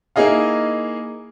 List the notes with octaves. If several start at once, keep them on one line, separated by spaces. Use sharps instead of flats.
A#3 D#4 E4 G#4 D#5 F5